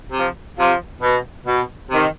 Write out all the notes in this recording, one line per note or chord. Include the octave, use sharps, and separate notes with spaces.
C3 F3
C3 F3
B2
B2
C3 D#3